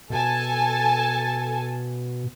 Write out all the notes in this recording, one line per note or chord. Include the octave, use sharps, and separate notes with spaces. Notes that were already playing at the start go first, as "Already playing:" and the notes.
B2 A4 G#5 A5